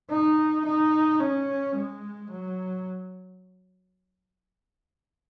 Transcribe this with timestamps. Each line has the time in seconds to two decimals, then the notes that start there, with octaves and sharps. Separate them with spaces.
0.10 D#4
0.65 D#4
1.20 C#4
1.75 G#3
2.31 F#3